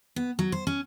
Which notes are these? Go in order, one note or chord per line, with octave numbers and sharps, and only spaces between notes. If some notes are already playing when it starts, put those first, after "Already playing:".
B3
F#3
C5
C#4